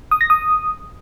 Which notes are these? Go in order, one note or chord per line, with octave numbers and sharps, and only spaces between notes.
D#6
A#6
D#6